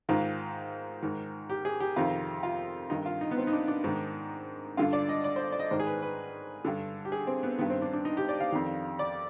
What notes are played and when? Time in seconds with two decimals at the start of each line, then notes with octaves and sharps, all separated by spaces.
0.09 G#2 D#3 F4
1.02 G#2 D#3
1.50 G4
1.65 G#4
1.80 G4
1.96 F2 C3 D#3 F4
2.43 F4
2.90 G2 D#3 D#4
3.06 F4
3.21 D#4
3.31 B3
3.37 C4
3.47 D#4
3.53 D4
3.68 D4
3.84 G#2 D#3
4.77 G2 D3 F4
4.93 D5
5.09 D#5
5.24 D5
5.36 C5
5.52 D5
5.59 D#5
5.71 G#2 D#3 C5
5.80 G#4
5.86 B4
6.02 B4
6.65 G2 D3
7.05 G4
7.12 G#4
7.27 C4
7.43 B3
7.59 G2 D#3 B3
7.70 C4
7.82 D4
7.93 D4
8.05 D#4
8.17 G4
8.29 D5
8.40 F5
8.52 F2 D#3
8.99 D5